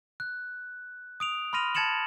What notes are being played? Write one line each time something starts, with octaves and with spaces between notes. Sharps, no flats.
F#6
D#6 D7 F7
B5 C6 F6 A#6 D#7 F7
A5 G#6 A6 C#7 E7 F#7